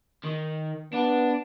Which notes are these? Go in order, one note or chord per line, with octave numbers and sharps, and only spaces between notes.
D#3
B3 D4